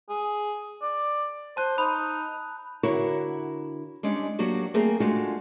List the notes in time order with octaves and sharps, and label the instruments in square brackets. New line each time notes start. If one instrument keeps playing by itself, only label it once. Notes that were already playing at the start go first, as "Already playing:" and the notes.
[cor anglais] G#4
D5
[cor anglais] C5 [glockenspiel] A5 F#6
[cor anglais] D#4 [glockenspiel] B5
[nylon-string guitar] D3 E4 F#4 A#4 C#5
G3 G#3 C#4 D4
F#3 A#3 D4 F#4 G4
A3 A#3 C4 G#4 A#4
G#3 A3 D4 F4 F#4